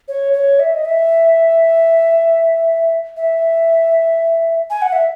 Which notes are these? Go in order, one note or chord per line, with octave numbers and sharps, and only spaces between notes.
C#5
C#5
E5
D#5
E5
E5
G#5
F#5
E5